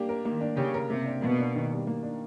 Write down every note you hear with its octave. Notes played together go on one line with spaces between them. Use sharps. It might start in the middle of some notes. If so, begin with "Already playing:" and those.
Already playing: A#3 D4 G4
A#4
D#3 A#3
D4
C#3 G4
A#4
C3 A#3
D4
B2 A#3
D4
D#3
G3
A#3
D4